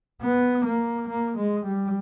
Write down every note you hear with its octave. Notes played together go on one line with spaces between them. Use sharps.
B3
A#3
A#3
G#3
G3